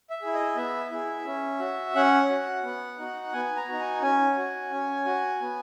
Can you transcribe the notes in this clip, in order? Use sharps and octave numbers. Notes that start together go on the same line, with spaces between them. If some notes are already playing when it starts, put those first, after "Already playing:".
E5
E4 G#4
D#5
B3 E5
E4 G#4
C#4
F#4
C#4 F#5
F#4
B3
D#4 F#4
B3 G#5
A#5
D#4 F#4
G#5
C#4 G#5
F#4
C#4
F#4
B3